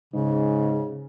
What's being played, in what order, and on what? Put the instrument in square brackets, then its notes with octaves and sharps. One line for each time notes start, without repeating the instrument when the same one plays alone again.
[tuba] G#2 [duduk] C#3